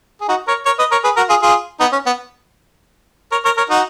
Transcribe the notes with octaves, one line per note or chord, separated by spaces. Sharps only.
G#4
D#4 F#4
A#4 C#5
A#4 C#5
B4 D#5
A#4 C#5
G#4 B4
F#4 A#4
F4 G#4
F4 G#4
B3 D#4
C#4
B3
A#4 C#5
A#4 C#5
A#4 C#5
D#4 F#4